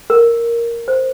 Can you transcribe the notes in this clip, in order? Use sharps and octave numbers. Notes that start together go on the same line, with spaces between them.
A#4
C5